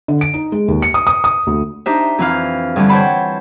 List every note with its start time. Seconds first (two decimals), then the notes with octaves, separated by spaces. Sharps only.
0.08 D3
0.21 D7
0.34 D#4
0.52 G#3
0.68 D#2
0.82 C#7
0.94 D#6
1.07 D#6
1.24 D#6
1.47 D2
1.86 D4 D#4 G4 C5 E5
2.18 F2 E3 B4 F5 F6
2.76 G2 D3 E3 G3
2.89 C5 C#5 F#5 G5 A5 B5